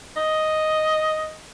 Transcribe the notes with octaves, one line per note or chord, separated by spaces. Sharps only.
D#5